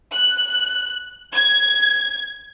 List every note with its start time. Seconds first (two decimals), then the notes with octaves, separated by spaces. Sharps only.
0.13 F#6
1.35 G#6